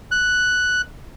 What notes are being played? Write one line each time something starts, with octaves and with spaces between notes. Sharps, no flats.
F#6